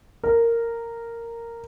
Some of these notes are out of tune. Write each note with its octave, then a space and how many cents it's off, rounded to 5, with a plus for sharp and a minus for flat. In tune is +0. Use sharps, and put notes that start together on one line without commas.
A#4 -10